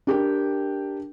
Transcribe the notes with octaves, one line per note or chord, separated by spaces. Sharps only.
D4 G4 A#4 G5